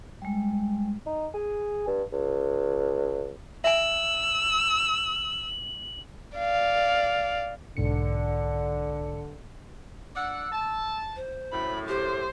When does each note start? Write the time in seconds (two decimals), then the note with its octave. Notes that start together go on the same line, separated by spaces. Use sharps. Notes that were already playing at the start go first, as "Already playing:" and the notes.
0.22 G3 G#3
1.06 D#4
1.34 G#4
1.87 G2
2.12 C#2
3.64 E5 G#5 E6 F#7
6.38 D5 F5
7.77 B1 G#2 D3 C#7
10.16 D4 D5 F#5 E6
10.52 A5
11.16 C5
11.52 F#2 A2 B5
11.88 G4 C5